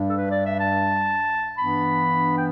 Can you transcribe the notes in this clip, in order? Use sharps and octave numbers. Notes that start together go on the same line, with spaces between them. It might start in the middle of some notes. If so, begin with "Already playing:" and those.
Already playing: G2 G3 D4
A4
B4
D5
E5
A5
G2 E3 B3 D4 B5
G5